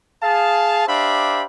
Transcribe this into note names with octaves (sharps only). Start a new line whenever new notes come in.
G#4 F5 A5
D4 G4 C5 E5 F5 B5